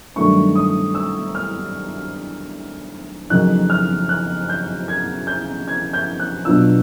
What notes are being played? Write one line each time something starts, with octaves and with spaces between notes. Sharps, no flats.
G2 D#3 F#3 A3 D4 C#6
D#6
E6
F6
F2 C#3 F#3 A#3 D#4 F#6
F6
F#6
G6
G#6
G6
G#6
G6
F#6
B2 F#3 B3 D4 F4 E6